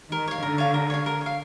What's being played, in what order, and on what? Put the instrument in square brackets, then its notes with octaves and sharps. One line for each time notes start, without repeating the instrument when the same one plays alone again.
[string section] D#3 [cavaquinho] A#4
[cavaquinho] C#5 F5
[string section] D3 [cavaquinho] A#4
[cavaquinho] C#5 F5
A#4
C#5 F5
A#4
C#5
F5